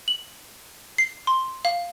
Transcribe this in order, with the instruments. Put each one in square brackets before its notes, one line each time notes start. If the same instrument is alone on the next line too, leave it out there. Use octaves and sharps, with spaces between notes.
[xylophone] F#7
C7
C6
F5